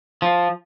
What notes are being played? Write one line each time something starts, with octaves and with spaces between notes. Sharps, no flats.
F3